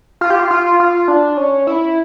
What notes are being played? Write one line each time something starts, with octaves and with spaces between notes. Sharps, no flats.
F4
G4
F4
F4
F4
D4
C#4
E4